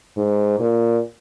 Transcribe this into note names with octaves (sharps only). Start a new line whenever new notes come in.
G#2
A#2